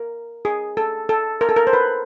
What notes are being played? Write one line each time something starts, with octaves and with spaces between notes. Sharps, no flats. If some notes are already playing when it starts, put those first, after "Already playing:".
Already playing: A#4
G#4
A4
A4
A#4
A4
A#4
C5
B4